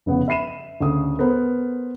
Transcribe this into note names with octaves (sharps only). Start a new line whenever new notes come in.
F1 C#3 B3 F#5
E5 B5 C7 D#7 E7
D2 C#3 D#6
B3 A4 A#4 C5